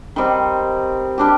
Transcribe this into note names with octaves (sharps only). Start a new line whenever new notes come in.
D#3 G3 C4
G3 D4 G4